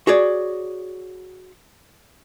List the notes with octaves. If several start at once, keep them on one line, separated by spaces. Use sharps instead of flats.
F#4 G#4 C#5 D5